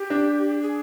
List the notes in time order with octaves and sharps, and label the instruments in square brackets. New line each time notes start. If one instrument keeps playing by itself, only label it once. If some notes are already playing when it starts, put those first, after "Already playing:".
Already playing: [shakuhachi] G4
[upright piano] D4
[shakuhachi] G#4